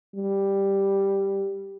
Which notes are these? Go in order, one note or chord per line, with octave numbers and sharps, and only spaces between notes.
G3